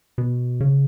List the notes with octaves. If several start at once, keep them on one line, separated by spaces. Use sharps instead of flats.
B2
C#3